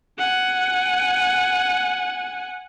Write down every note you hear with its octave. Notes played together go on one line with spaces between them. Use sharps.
F#5 G#5